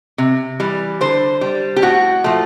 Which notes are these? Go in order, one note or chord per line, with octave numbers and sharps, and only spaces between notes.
C3
E3 G3
D3 C5
G3
G4
A2 F#4
F3 A3